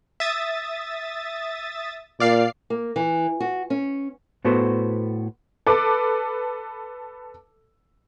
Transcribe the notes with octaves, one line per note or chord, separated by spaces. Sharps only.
E5 D#6 A6
A#2 D5 F5 C7
A#3
E3
F#4
C#4
A2 B3 F#4 A4 B4 C5
A4 B4 D6